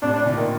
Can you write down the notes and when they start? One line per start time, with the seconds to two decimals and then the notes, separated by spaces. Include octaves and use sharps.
0.02 A2 C3 D4
0.14 D4
0.26 A#2 D3
0.37 D#3